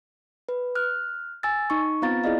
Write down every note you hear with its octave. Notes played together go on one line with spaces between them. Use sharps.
B4
F6 F#6
G#5 E6 A6
D#4 C#6
B3 C4 F4 F5 A#5 A6
E4 G#4 D5 D#5 F5